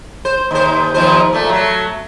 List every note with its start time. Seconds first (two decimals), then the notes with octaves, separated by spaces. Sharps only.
0.25 C5
0.51 D#2 C5
0.94 D#2 F3 C5
1.33 A#2 A3
1.49 F#3 A3